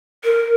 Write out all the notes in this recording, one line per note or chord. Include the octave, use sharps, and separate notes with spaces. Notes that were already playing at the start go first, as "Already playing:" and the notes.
A#4